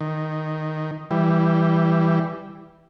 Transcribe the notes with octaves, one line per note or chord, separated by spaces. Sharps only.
D#3
E3 G3